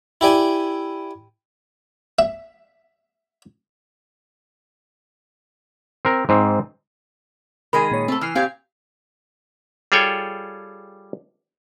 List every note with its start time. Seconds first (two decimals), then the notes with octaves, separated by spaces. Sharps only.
0.21 E4 G4 D5 G#5
2.19 E5
6.05 C4 A#4
6.29 G#2 C4
7.73 D#3 G#3 G#4 A#4 B5
7.91 A#2 C#5
8.08 A3 C4 A4
8.21 E3 E6 F6 C7
8.35 A#2 C4 G4 F5 G#6 C7
9.92 G3 F4 G#4 A4 C#5 G5